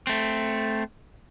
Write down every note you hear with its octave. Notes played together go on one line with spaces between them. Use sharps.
A3 C4